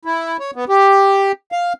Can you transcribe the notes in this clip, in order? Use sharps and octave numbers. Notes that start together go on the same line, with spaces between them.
E4
C#5
B3
G4
F5